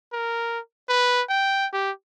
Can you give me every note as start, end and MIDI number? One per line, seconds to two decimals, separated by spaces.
0.13 0.59 70
0.89 1.22 71
1.29 1.66 79
1.73 1.91 67